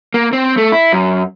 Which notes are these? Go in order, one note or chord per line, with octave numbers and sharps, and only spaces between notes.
A#3
C4
A3
E4
F#2